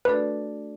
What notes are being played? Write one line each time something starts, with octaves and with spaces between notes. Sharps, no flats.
A3 D4 F#4 A4 B4 D5